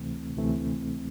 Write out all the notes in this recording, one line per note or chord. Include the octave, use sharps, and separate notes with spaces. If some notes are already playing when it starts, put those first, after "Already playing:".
Already playing: D2 C3 E3 A3 C4
D2 C3 E3 A3 C4